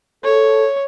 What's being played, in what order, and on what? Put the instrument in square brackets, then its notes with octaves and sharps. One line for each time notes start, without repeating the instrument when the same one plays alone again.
[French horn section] A4 [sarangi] C#5